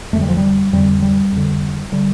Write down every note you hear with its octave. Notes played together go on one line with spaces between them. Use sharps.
F2 D3 A3
G3
F3
G3
F2 D3 G3
G3
F2 D3
D3 G3